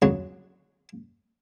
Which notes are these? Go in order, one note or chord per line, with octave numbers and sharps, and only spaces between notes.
C#2 C#3 F#3 G#3 C#5 F#5